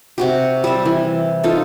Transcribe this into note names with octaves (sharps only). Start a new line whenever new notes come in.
C3 F#4 G4
G3 E5
E3
D#4 F4 A4